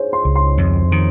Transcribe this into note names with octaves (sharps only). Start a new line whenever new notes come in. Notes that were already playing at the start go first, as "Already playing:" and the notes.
Already playing: G#4 C5 C#5
C6
C#2
C6
F2
D#3